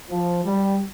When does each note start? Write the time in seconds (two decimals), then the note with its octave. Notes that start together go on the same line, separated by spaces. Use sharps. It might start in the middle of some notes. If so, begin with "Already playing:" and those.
0.10 F3
0.45 G3